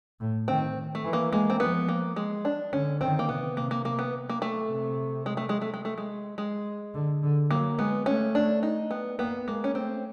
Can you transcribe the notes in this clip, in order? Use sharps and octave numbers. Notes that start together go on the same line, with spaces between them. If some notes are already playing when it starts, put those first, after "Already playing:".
A2
D#3 C4
A3
E3
A#3
G#3 A#3
C4
F3 B3
A#3
G#3
D4
D3 C#4
D#3 C4
A#3
C3 B3
C3 A#3
A#3
A#3
B3
A#3
A3
C3
G#3
A3
G#3
A3
G#3
A3
G#3
G#3
D3
D3
F#3 A#3
G#3 B3
A3 C#4
D4
D#4
B3
A#3 B3
G#3 A#3
C#4
A3 C4